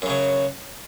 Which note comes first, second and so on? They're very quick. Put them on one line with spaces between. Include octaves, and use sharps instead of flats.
F#2 C#3 F#3